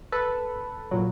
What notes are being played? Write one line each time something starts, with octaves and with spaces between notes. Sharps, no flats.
A4 B4
A#2 F#3